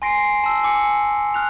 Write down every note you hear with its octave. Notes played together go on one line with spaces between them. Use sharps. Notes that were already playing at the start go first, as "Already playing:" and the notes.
G#5 C6 A#6 C7 D7
A5 E6
G#5 D6 C#7
F6 F#6 F7